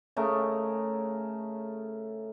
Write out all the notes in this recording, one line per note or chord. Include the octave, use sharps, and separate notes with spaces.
C#3 A3 A#4 D#5